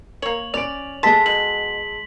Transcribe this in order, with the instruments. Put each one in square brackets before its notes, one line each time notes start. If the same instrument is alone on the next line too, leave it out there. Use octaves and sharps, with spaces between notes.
[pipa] A#3 C#5 [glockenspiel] F#7
[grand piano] C#4 D7 [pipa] D5 [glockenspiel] F7
[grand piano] G#3 A4 D#5 [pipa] A5 [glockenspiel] C6 B6
[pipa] B2 [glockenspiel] F#7